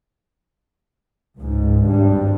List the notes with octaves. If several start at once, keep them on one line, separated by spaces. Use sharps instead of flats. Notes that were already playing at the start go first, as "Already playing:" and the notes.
C#2 G#2
G#1 G2 G3